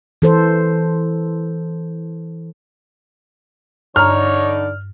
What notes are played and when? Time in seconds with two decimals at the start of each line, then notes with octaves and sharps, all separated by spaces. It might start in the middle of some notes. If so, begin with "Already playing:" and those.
0.22 E3 A4 C5
3.96 G2 D3 D#4 C#5 D5 A#5 F6